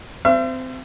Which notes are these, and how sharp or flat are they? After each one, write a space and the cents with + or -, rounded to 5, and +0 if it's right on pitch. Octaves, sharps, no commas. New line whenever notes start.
C4 -25 E5 +40